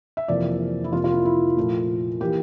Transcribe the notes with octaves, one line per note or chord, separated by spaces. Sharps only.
E5
F2 C3 E3 A#3 D5
E4
F2 C3 F3 A#3 F4
F4
E4
E4
A#2 F3 A3
E3 A#3 G4